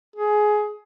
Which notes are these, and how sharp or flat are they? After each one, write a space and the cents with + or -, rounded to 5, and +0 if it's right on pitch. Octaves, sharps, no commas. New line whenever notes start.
G#4 +15